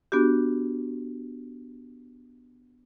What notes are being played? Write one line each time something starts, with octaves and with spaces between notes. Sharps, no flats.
B3 D4 F#4 G4